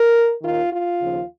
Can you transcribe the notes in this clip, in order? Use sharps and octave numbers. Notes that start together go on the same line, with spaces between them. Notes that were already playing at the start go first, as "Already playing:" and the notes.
Already playing: A#4
D#2 D#3 F4
F4
D#2 C#3 F3